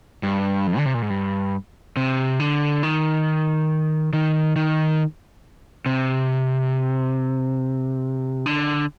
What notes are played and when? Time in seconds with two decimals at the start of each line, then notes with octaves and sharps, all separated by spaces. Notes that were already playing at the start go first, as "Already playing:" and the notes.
0.23 G2
0.67 F2
0.78 D3
0.86 C3
0.94 A#2
1.02 G#2
1.10 G2
1.97 C3
2.40 D3
2.83 D#3
4.13 D#3
4.56 D#3
5.86 C3
8.46 D3